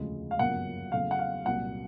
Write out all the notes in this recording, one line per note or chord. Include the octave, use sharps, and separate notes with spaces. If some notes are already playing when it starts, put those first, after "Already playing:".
Already playing: E1 D2 C#3 F3 G#3
F5
G1 F#2 C#3 F3 A#3 F#5
E2 C#3 F#3 A3 F5
F#5
F5
C2 A#2 F#3 F#5